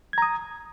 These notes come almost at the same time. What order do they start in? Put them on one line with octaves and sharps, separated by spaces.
G#6 A#5 D#6